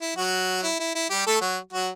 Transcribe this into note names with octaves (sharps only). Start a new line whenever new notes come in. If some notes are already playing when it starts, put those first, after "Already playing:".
E4
F#3 F#4
E4
E4
E4
G3 G4
A3 A4
F#3 F#4
F#3 F#4